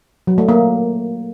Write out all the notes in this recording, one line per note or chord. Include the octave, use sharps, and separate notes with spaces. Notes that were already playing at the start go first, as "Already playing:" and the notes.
F#3
A3
A#3